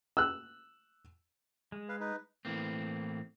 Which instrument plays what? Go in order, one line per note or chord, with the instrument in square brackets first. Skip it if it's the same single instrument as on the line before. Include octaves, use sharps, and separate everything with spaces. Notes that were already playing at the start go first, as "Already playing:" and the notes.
[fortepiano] E6 F#6
[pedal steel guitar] G#3
[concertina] B4 F5
D#4 B4
[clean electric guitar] A2 E3 A#3 C4